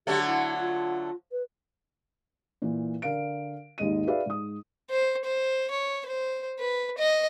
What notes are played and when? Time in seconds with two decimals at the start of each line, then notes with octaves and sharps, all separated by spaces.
0.07 D3 F#3 A3 G4
0.27 E4
0.59 F4
1.32 B4
2.62 A#2 E3
3.02 D3 A#4 F5 D7
3.78 G#1 D#2 G#2 D#5 D#7
4.07 F#4 G#4 B4 D5 E5 F5
4.26 G#2 D#6
4.91 C5
5.25 C5
5.71 C#5
6.07 C5
6.60 B4
6.98 D#5